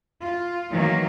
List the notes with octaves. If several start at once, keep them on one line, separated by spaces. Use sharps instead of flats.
F4
D#3 E3 F#3 A#3